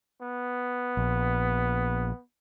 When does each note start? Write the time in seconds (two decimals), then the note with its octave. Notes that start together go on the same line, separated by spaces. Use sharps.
0.22 B3
0.97 A#1